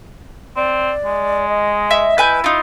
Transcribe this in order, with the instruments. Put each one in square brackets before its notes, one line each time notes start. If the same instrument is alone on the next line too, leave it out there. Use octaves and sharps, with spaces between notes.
[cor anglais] C4 [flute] D5
[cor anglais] G#3
[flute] D#5
[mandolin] E5
[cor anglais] E4 [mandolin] B4 G#5 G6
[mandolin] D#4 F4